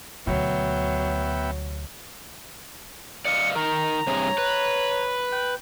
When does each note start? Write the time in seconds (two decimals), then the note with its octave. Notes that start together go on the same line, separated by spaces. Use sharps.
0.27 D2 B2 F#3 B3 E5 G5
3.25 D5 D#5 F5 C#7
3.56 D#3 A#4 A#5
4.07 G2 C3 G#4 C#5
4.38 B4
5.32 G5